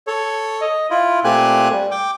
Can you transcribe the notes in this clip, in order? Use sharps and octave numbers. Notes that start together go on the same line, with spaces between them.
A4 C#5
D#5
E4 F4
A#2 A3 C4 G4 G#5 F#6
G3
G5 D6